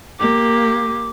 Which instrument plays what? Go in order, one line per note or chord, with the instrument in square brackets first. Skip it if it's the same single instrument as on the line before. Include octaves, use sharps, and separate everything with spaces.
[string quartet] A#3 G4 [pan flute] D6